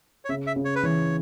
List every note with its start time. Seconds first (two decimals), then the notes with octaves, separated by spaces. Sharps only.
0.25 C#5
0.29 C#3 E5
0.47 E5
0.56 C#3
0.65 C#5
0.75 B4
0.83 E3 C#5